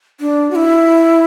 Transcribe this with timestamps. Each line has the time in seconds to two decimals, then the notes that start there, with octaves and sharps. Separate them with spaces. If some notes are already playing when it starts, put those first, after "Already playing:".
0.20 D4
0.51 F#4
0.56 E4